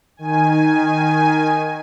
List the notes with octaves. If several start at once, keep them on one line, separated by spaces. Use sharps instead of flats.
D#3 G#5